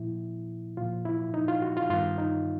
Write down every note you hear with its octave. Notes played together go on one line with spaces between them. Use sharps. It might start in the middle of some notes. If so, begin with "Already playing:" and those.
Already playing: A#2 F3 E4
A#2 F3 F4
E4
D#4
F4
F#4
F4
G2 D#3 F4
D#4